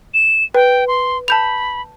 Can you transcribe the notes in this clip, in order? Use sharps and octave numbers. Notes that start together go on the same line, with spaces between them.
E7
B4 G5
C6
A5 B5 G6 F7